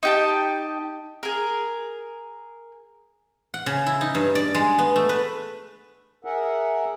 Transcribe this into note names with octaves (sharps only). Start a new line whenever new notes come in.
D#4 G4 A5
G#4 A#4
F#5
C#3
E4
D#4
G2
D5
G#3
B3
A3
B4
G#4 A#4 E5 F#5